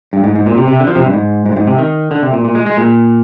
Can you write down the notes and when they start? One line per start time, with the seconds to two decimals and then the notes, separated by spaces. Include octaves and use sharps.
0.13 G2
0.24 G#2
0.35 G#2
0.46 A#2
0.57 C3
0.68 C3
0.80 D3
0.87 F3
0.95 C3
1.06 G2
1.13 G#2
1.46 G#2
1.52 G2
1.56 G#2
1.67 C3
1.78 D#3
2.11 D3
2.22 C3
2.33 A#2
2.45 A#2
2.55 G#3
2.66 G#3
2.77 A#2